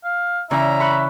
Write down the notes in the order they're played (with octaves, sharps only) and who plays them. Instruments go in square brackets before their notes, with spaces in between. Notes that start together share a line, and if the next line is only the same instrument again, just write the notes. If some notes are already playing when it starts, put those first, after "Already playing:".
[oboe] F5
[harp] C#3 E3 D5 [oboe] E5 [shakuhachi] A#5
[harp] B5 C#6 F#6